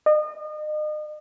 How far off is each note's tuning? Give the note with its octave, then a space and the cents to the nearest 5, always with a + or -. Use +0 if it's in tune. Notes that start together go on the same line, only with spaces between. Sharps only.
D#5 -35